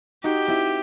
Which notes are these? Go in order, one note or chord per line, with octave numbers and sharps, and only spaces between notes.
D#4 F#4 G4
C4 E4